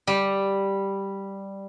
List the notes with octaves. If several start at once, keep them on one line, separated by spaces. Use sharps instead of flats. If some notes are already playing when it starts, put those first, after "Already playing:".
G3